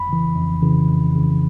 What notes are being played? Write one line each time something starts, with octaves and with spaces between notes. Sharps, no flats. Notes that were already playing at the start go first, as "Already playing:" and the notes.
Already playing: F2 B5
C#3 E3
F2
C#3 E3
F2
C#3 E3